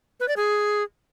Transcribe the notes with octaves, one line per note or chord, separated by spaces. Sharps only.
B4
D5
G#4